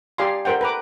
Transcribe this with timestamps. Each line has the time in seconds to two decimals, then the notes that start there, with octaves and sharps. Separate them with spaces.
0.18 G4 D5 F5 G#5 A#5 C6
0.45 A4 A#4 C5 F#5 G5
0.61 B4 A#5 D6